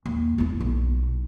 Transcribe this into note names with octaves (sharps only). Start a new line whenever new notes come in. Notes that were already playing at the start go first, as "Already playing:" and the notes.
D#2
E2 E4
B1